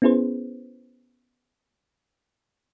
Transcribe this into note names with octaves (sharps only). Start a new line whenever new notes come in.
B3 C#4 E4 G#4 B4 C5